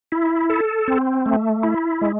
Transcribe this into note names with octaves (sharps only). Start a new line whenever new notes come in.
E4
A4
C4
A3
E4
G#3